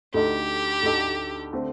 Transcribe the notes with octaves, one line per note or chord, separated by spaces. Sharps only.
D2 D3 A3 D#4 G4 A4
D2 D3 A3 D#4 A4
D3 A3 C4